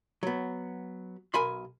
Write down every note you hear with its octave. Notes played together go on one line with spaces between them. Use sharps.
F#3 B3
B1 A#4 G#5 B5 C6